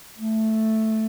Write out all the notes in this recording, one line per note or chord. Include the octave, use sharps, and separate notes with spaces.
A3